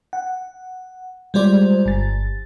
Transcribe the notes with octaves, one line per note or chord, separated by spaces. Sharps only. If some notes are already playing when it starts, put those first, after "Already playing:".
F#5
G3 G#3 F4 C5 D5
G1 A6